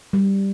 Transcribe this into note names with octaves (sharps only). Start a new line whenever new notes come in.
G3